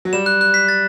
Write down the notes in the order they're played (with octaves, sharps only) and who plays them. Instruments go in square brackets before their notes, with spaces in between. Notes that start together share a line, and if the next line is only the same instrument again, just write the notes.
[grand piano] F#3
[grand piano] G3 [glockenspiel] E7
[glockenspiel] F#6
F#6
B6
A6